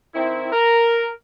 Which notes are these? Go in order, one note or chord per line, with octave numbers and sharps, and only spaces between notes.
D#3 C4 E4
A#4